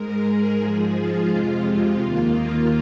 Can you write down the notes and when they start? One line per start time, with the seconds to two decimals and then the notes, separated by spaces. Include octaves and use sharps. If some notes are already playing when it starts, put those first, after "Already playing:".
Already playing: G#2 G#3 A#4
0.20 G#4
0.56 G#2 F3 G#3
0.92 F4
1.28 F2 C3 G#3 F4
1.64 F4
2.01 D#2 D#3 A#3
2.37 F4